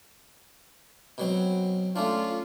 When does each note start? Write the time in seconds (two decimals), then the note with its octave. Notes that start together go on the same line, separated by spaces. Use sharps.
1.18 B2 F#3 C4
1.96 A3 C#4 D4 F4